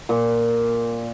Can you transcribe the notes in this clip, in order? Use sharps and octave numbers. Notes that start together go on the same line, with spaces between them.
A#2